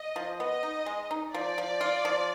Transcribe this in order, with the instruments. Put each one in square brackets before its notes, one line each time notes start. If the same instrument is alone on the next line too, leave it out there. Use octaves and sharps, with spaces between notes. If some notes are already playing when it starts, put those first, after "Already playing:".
Already playing: [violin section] D#5
[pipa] F3
[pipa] B3 [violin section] D#5
[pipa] D#4
G#3
D#4
[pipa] F3 [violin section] D5
[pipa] F3
F4
F3